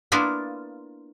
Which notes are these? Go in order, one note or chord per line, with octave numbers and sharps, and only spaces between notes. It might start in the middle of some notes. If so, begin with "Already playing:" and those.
A#3 B3 D4 E4 F4